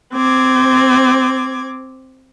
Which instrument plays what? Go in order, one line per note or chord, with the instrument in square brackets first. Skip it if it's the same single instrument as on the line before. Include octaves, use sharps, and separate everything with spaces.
[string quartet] C4 D6 G#6